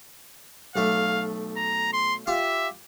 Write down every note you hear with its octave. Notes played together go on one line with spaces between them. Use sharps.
B1 A3 F5
A#5
C6
F4 G4 E5